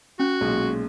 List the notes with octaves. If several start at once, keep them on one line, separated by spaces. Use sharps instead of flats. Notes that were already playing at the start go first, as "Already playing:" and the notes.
C#4 F#4
B1 A#2 G#3